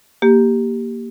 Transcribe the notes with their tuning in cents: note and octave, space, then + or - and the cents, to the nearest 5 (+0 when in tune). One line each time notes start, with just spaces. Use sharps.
A#3 +0 G4 +0